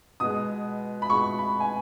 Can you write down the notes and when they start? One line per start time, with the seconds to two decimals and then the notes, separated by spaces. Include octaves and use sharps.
0.20 B2 G#3 D#6
1.02 B5
1.09 B2 G#3 C#6
1.39 B5
1.60 G#5